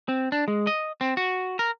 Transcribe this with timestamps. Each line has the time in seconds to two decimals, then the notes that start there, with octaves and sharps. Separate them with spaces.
0.09 C4
0.32 D4
0.48 G#3
0.67 D#5
1.01 C4
1.17 F#4
1.59 A#4